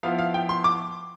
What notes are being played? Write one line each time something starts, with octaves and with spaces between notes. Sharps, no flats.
F3 B3 E4 F5
F5
G5
C6
D6